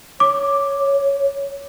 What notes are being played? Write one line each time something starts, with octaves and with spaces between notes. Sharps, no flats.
C#5 D6